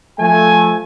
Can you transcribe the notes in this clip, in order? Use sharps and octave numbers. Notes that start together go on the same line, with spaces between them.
F3 A3 G#5